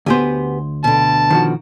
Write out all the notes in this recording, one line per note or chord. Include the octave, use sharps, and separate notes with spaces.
D2 B3 G4 C5 G#5
B2 D3 A5
D#3 F3 F#4